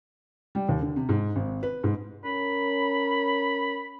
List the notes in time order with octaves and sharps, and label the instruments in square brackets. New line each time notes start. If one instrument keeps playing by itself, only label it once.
[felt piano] G3
D#2
D3
C3
G#2
G#1
B4
G#2
[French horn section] C#4 A#4 [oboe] B5